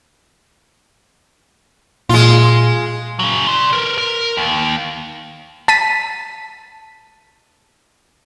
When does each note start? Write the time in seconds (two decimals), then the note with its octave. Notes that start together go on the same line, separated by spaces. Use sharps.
2.09 A#2 G#3 F4
3.19 C#3 F#3
3.47 D5 C6
3.73 A#4 B4
3.98 A#4
4.37 D#2
5.68 A5 B6 D#7